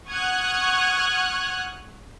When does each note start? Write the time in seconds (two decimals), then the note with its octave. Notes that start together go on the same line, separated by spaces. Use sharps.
0.11 F#5 C#6 D#6 F6 F#6 G#6